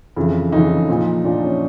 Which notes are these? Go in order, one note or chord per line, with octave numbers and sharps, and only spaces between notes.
F2 C#3 E3
F2 C#3 E3 D#4
A#2 F3
A#2 F3 D4
C#4